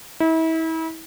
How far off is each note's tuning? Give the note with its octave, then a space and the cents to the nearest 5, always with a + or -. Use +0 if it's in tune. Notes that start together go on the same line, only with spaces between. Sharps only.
E4 -35